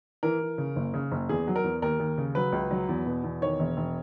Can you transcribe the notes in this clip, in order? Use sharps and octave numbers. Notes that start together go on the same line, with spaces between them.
E3 A#4
E3
C#3
F#1
C#3
F#1
E2 G#4
F#3
A#4
E2
D#2 A#4
D#2
C#3
F#3 B4
C#2
F#3
E2
B2
E2
D#3 C#5
E1
E1